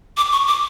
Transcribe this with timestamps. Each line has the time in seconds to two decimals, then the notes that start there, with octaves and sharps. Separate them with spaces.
0.17 D6
0.32 C#6
0.47 D6